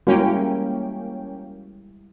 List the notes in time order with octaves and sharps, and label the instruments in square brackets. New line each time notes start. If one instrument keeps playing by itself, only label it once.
[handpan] G3 G#3 E4 [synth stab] A#3 C#4 G5 [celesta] F#4